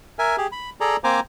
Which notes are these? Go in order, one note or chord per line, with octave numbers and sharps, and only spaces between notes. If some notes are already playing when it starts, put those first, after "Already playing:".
A#4 E5 G#5
G4 G#4
B5
G#4 A4 D5 A#5
A#3 C4 C5 G#5 A#5 D6